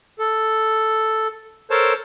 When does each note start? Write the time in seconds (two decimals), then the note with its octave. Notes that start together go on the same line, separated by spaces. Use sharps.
0.19 A4
1.71 A4 A#4 C5 C#5 A5